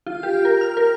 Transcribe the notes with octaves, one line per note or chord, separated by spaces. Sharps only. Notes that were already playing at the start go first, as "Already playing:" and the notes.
F4
G4
A#4
F6
A#4